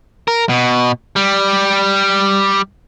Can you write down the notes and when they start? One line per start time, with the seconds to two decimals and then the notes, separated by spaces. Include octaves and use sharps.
0.28 A#4
0.49 B2
1.16 G3